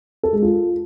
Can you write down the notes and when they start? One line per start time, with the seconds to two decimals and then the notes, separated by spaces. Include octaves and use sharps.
0.23 A4
0.33 G#3
0.42 F4